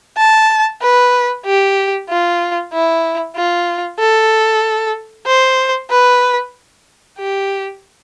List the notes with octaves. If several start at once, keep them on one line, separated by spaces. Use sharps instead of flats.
A5
B4
G4
F4
E4
F4
A4
C5
B4
G4